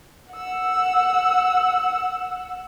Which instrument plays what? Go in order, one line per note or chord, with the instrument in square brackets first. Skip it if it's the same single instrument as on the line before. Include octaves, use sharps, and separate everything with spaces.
[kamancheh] F#5 E6